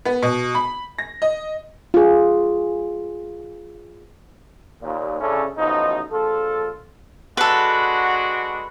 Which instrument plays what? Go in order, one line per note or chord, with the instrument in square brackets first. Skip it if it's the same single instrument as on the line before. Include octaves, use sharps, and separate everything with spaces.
[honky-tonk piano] B3
B2
B5
A#6
D#5
[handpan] F4 G#4
[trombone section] D#2 A#2
C#3 C#4 D4 E4 A4
A1 B2 F3 D#4
A#1 F4 A4
[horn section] G#3 D4 F#4 [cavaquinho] A4 B4